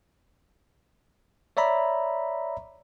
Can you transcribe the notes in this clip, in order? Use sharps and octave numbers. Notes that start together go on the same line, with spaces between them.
C#5 D5 E5 A#5 B5